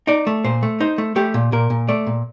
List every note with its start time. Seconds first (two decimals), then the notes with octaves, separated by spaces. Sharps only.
0.07 D#4 D5
0.27 A3
0.44 A#2 C5
0.63 A3
0.80 D#4 C5
0.98 A3
1.16 A3 G4
1.34 A#2
1.52 A#2 A#4
1.70 A#2
1.89 A3 D5
2.07 A#2